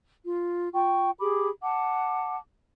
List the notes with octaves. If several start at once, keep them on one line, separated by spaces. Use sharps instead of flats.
F4
F4 G5 C#6
G4 G#4 B5 D6
F#5 A5 D6